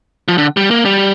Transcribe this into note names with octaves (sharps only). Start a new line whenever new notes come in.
F3
D3
G3
A#3
G3